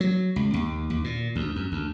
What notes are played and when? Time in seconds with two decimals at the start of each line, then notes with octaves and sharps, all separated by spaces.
0.01 F#3
0.36 C#2
0.54 D#2
0.90 D#2
1.04 A#2
1.36 D2
1.56 F#2
1.72 D2